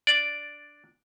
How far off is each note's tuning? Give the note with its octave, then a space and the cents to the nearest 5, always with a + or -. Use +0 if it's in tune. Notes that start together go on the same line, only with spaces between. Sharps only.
D4 +0 D5 +0